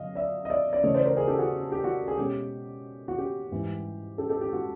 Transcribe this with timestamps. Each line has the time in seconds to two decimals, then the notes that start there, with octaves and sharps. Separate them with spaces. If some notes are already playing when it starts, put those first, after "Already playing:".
Already playing: F#2 D3 D#5 F5
0.15 D5 E5
0.45 D#5
0.50 D5 E5
0.73 D5
0.83 C#3 E3 A3 C#5 D#5
0.94 C5 D5
1.06 A#4 C5
1.16 G#4 A#4
1.28 G4 A4
1.39 F#4 G#4
1.72 G4
1.84 F#4
2.08 G#4
2.17 B2 G#3 C#4 G4
3.08 F#4
3.18 G4
3.51 G#2 E3 G3
4.18 G4 A4
4.29 G4 A4
4.41 G4
4.53 F#4